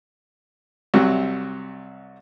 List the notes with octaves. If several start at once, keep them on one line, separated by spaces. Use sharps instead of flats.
C2 C3 F#3